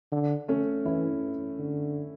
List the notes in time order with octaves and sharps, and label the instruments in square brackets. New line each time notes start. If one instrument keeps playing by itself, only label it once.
[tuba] D3
[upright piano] A3 C#4
[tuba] E3 [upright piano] C#4 E4
[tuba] D3